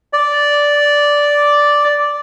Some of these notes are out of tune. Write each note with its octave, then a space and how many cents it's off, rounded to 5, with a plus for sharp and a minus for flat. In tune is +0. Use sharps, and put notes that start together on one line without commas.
D5 -5